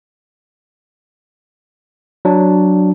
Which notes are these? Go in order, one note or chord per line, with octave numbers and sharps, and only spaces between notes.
F#3 D4